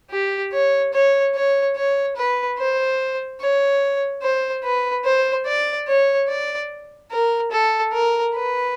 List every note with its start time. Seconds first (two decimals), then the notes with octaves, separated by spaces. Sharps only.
0.11 G4
0.53 C#5
0.93 C#5
1.35 C#5
1.76 C#5
2.17 B4
2.58 C5
3.41 C#5
4.23 C5
4.64 B4
5.05 C5
5.46 D5
5.88 C#5
6.29 D5
7.11 A#4
7.52 A4
7.93 A#4
8.35 B4